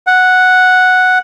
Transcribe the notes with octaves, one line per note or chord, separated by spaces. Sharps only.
F#5